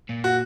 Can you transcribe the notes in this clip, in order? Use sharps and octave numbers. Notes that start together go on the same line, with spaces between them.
A#2
F#4